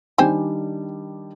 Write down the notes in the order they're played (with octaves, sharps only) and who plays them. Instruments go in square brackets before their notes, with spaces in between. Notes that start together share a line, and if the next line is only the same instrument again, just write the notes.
[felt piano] D#3 G3 D4 [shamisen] C5 G5 G#5